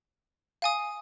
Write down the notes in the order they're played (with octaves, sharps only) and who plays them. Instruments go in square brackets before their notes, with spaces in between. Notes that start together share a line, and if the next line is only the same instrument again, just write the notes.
[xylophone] F5 G#5 D#6